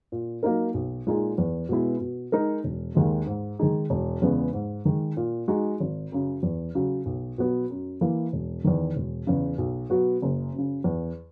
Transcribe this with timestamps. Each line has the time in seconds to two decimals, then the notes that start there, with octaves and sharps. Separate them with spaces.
0.12 A#2
0.43 F#3 A#3 D#4 A#4
0.74 B1
1.07 A#2 G#3 D#4 G#4
1.38 E2
1.69 B2 G#3 B3 E4
2.01 B2
2.32 G#3 D#4 A#4
2.64 E1
2.95 D#2 D#3 G#3
3.27 G#2
3.59 D#3 G#3 D#4 G#4
3.90 E1
4.22 E2 C#3 G#3 B3
4.53 G#2
4.85 D#3 G#3
5.17 A#2
5.48 G#3 D#4 F#4
5.80 G#1
6.12 F#2 C#3
6.43 E2
6.75 C#3 F#3
7.06 B1
7.38 B2 F#3 B3 F#4
7.70 F#2
8.01 E3 A#3 E4
8.33 E1
8.64 E2 D#3
8.96 E1
9.27 E2 C#3
9.58 B1
9.90 B2 F#3 B3 F#4
10.22 F#1
10.53 F#2
10.58 C#3
10.84 E2